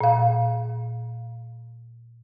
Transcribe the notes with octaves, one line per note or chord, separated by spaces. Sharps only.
A#2 F5